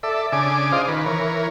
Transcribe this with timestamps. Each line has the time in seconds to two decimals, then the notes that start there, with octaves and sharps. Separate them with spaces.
0.03 A4 D5 E5
0.32 C#3 D4 G#5 D6
0.72 F4 G#4 C5 D5 D#5 F5
0.88 D#3 B4
1.06 E3 A#4 C#5